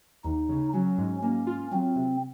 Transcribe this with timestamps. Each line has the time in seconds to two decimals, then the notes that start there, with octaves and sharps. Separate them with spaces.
0.24 D#2 D#4
0.49 C#3
0.73 F#3 C#4
0.98 G#2
1.23 A#3 C#4
1.47 F4
1.72 F#3 C4
1.96 C3